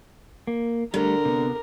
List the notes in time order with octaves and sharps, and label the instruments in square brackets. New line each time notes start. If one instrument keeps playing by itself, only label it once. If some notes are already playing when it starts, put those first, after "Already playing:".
[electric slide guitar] A#3
[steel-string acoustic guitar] D3 [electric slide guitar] G3 A3 [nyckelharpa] A#4
[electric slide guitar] C3 B3